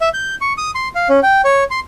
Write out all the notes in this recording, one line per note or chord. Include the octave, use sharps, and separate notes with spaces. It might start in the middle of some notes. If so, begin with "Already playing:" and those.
E5
G6
C#6
D#6
C6
F5
C#4
G5
C#5
C6